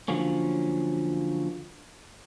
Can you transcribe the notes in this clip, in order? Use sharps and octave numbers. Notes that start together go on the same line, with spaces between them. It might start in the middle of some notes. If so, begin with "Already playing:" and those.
D3 F3 F#3 A#3 C#4